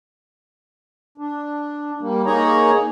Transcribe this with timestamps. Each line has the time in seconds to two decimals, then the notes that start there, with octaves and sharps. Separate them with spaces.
1.18 D4
2.01 G3 A#3
2.26 A#3 D#4 G#4 C#5 A#5